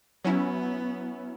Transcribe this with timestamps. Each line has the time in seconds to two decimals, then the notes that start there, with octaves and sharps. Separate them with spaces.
0.24 F#3 B3 C#4 E4